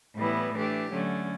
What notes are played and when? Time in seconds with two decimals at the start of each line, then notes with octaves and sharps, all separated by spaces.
0.15 A2 E3 G3 B3 E4
0.53 E3 A3 D4 G4
0.91 D3 F#3 A3 C#4